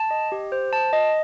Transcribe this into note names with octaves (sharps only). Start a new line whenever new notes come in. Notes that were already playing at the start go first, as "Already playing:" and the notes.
Already playing: A5
D#5
G4
C5
A5
D#5